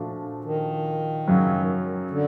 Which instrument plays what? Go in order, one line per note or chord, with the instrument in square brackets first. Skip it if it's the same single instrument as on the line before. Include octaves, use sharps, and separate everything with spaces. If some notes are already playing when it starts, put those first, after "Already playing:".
Already playing: [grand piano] A#2 F3 A3 D4 F#4
[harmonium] D#3
[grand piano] F#2 C#3 F#3
[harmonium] D3